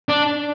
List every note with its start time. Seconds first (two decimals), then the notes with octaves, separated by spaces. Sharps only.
0.09 D4